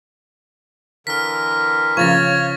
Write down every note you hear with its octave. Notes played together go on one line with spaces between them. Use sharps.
D3 E3 A#4 F6 B6
C#3 F3 C#5 C#6 A6 A#6